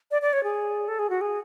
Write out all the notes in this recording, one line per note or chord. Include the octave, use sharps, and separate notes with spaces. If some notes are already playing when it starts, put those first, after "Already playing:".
D5
D5
C#5
G#4
A4
G#4
F#4
G#4